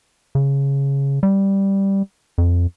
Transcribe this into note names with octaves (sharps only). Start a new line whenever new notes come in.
C#3
G3
F2